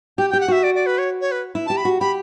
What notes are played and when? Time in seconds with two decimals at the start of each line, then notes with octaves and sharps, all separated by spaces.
0.18 G4 G5
0.30 G4 G5
0.41 F#5
0.48 F#4 E5
0.63 D5
0.75 D5
0.86 B4
0.98 C#5
1.21 C#5
1.32 B4
1.55 E4
1.66 G4 A5
1.77 B5
1.85 F#4
2.00 G4 B5